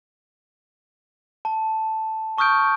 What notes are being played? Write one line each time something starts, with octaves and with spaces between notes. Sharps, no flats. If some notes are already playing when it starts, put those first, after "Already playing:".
A5
A5 C#6 D#6 F6 G6 D7